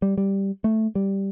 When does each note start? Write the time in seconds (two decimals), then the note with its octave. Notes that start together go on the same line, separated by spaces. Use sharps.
0.02 G3
0.18 G3
0.64 A3
0.95 G3